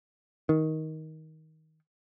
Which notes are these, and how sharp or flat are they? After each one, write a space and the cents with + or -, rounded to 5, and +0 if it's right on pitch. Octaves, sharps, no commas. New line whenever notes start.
D#3 +15